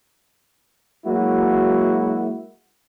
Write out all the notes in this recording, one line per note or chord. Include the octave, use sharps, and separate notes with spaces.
F#3 G#3 A#3 E4 F#4